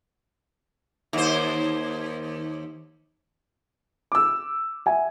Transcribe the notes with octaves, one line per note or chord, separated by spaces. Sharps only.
D#2 C5
D6 E6
E5 G#5